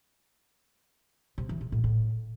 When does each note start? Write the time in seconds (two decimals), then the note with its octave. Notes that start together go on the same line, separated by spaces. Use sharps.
1.38 C3
1.49 E3
1.61 C3
1.72 A2
1.84 A2